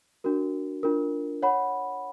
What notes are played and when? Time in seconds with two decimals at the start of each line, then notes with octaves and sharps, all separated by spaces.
0.24 D4 F#4 A#4
0.83 D4 F4 A#4
1.42 C#5 F#5 B5